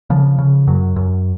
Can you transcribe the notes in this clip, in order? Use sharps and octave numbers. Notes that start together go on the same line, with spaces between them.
C#3 F3
C#3
F#2 F#3
F#2